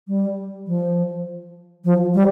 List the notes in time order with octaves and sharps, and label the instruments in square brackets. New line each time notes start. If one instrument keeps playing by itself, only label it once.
[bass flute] G3
F3
F3
G3